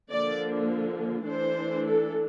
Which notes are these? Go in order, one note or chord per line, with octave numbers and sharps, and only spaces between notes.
D3 F3 A#3 D5
E3 A3 D4 C5
A4